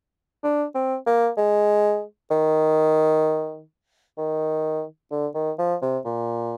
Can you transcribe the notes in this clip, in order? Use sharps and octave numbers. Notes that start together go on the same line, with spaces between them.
D4
C4
A#3
G#3
D#3
D#3
D3
D#3
F3
C3
A#2